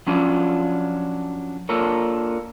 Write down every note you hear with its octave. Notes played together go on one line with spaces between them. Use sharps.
F3 F#3 C#4 D4 F4
A#3 D4 F4 A4 A#4 C#5